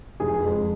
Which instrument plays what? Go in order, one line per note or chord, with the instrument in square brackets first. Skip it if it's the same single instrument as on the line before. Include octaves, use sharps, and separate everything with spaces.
[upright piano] F1 [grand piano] G#4
[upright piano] F2 F3 G#3